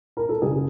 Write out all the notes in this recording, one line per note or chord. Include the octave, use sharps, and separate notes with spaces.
A#4
A4
F#1 G#4